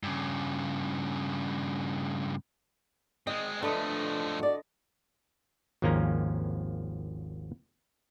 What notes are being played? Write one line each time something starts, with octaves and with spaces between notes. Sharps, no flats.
G2 C#3
G#3 C4 D#5
D3 F3 A3 B4 D#5
F#4 D5
G#1 D#2 F3 A#3 C#4 A#5